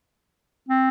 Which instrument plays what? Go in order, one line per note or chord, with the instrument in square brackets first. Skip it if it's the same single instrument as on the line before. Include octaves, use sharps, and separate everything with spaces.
[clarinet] C4